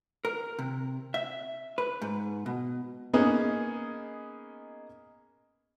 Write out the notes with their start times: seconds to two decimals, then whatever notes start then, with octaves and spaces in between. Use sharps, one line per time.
0.25 A#4
0.59 C3
1.14 E5
1.78 B4
2.02 G#2
2.46 B2
3.13 A#3 B3 C#4 D#4 G#4